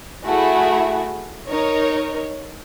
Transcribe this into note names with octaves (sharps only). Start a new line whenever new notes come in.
A3 E4 F#4 G#4
D#4 A#4 C#5